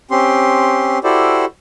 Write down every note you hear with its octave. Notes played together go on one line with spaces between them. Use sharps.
C4 C#4 G4 C6
E4 F#4 G4 A4 C5 D5